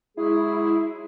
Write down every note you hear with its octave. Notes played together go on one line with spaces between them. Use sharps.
F#3 G#3 E4 G#4